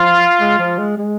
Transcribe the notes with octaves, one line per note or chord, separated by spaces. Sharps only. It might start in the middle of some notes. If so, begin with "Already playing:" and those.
Already playing: F3 F4
G#3
F3
G#3
G#3